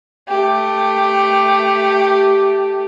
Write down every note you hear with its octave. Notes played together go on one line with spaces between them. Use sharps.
A3 G4